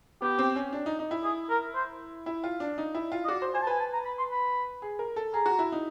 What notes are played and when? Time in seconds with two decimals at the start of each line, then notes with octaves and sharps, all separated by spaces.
0.22 B3 G4
0.39 C4
0.56 C#4
0.73 D4
0.86 D#4
0.99 D#4
1.11 E4
1.24 G#4
1.50 A#4
1.75 C5
2.26 E4
2.44 F4
2.60 D4
2.78 D#4
2.95 E4
3.12 F4
3.25 D#5
3.28 F#4 D5
3.42 C5
3.54 C5 G#5
3.62 A5
3.67 B4 G#5
3.80 A5
3.93 A#5
4.05 B5
4.18 C6
4.32 B5
4.82 G#4
4.99 A#4
5.16 A4
5.34 G#4 A#5
5.46 F#4
5.59 E4
5.72 D#4